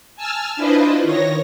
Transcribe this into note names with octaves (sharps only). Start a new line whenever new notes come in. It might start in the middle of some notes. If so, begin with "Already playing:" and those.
G#5 A5 E6 F6
D4 E4 F4 B4 C5 D#5
D#3 C#5 A#6